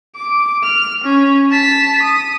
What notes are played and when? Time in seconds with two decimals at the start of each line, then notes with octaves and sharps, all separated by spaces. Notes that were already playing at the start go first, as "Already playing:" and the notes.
0.16 D6
0.64 F6
1.04 C#4
1.52 A5 B6
2.03 D#6